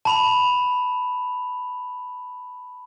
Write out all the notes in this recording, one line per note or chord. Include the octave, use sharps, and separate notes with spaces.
A5 B5 F7